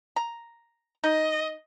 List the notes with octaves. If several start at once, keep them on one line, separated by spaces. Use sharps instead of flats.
A#5
D#4 D#5